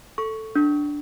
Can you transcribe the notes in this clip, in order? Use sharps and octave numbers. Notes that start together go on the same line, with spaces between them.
A4 C#6
D4